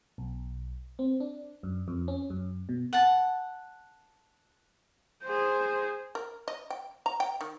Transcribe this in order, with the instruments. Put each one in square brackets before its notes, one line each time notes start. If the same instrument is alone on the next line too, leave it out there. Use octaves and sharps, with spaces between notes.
[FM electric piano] B1
C4
D4
F#2
F2
C#4
F#2
B2
[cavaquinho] F#5 A5
[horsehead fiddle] G#4 C5
[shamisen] A#4
D#5
G5
A#5
G5
D#3